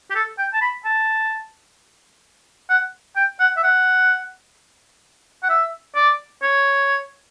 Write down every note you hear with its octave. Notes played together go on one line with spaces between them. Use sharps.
G4
A4
G5
A5
B5
A5
F#5
G5
F#5
E5
F#5
F#5
E5
D5
C#5